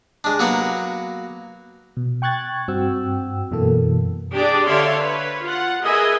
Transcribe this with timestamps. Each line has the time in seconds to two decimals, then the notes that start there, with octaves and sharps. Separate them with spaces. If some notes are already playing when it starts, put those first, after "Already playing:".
0.24 G#3 D4
0.39 F#3 A#3 B3 F#4
1.97 B2
2.22 G5 C#6 F#6 G#6 A6
2.68 G2 C4 F#4 G5 E6
3.51 F#2 B2 E3 A#3 A4
4.34 D4 G4 G#4 D5
4.67 D3 C#5 D5 E5 F5 C6
5.00 B4 C#5
5.43 F4 F#5
5.83 G#4 A#4 B4 D#5 E5 G#5